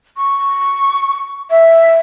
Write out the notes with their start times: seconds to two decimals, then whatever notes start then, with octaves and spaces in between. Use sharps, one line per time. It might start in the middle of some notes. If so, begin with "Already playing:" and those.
0.17 C#6
1.50 E5